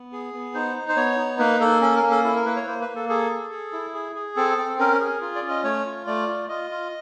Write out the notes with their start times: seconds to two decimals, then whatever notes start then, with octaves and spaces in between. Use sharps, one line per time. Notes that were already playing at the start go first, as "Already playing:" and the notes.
Already playing: B3
0.13 G#4
0.34 B3
0.55 D#4 C5
0.76 D#4
0.88 C5
0.96 B3 C#5
1.19 D#4
1.39 A#3 B4
1.60 A#3 A4
1.82 C#4 A4
1.96 A#4
2.03 A#3
2.11 A4
2.24 E4 A4
2.36 A#4
2.46 A#3 B4
2.56 C#5
2.67 A#3 C5
2.81 B4
2.88 A#3
2.96 A4
3.09 G#4 A4
3.31 G#4
3.51 G#4
3.73 E4
3.94 G#4
4.16 G#4
4.36 C4 A4
4.58 C4
4.79 C#4 A#4
5.00 G#4
5.21 F4
5.35 D5
5.43 C#4
5.50 D#5
5.64 A3 C#5
5.86 F4
6.07 A3 D5
6.28 F4
6.49 F4 D#5
6.70 F4